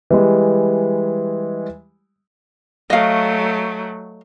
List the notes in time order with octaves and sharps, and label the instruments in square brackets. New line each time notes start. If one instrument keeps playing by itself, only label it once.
[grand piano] E3 G3 G#3
[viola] F#3 A3 [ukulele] D#5 F5